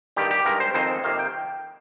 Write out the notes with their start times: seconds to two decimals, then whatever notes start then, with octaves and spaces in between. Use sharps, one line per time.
0.17 G2 D#3 G3 G4
0.31 G4
0.46 G2 D#3 G#3 A#4
0.60 C5
0.74 F2 D#3 G#3 C4 D#4 C5
1.04 F2 C3 D#3 A#3 F5
1.19 G5